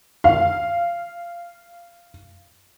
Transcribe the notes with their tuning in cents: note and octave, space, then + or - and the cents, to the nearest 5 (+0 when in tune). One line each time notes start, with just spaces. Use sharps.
F5 -15